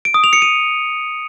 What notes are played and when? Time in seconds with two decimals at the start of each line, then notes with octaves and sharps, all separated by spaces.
0.05 D7
0.14 D#6
0.24 F7
0.33 C#7
0.42 D#7